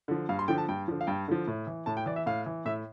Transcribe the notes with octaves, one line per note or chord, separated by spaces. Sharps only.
D3 F3
G2 F5
C6
D3 F3 G5
A5
G2 G5
D3 F3
F5
G2 G5
D3 F3
A2
E3
A2 A5
G5
E3 D5
E5
A2 F5
E3
A2 E5